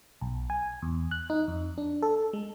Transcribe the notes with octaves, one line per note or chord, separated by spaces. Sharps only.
B1
G#5
E2
F#6
D#4
F2
D4
A4
G#3